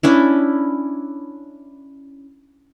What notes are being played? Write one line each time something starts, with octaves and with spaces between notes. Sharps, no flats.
C#4 D4 E4